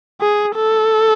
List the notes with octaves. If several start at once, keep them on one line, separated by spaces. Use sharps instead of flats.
G#4
A4